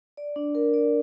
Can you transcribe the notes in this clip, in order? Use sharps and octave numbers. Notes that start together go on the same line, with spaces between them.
D5
D4
A#4
D5